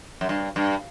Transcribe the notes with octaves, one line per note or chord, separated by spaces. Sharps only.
F#2
G2
G2